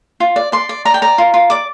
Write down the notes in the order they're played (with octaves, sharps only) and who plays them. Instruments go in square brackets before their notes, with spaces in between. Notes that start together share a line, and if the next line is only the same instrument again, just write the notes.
[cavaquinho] F4
D5
D5 C6
D5
D5 A#5
G5
D5 A#5
F4
F4
D5 D6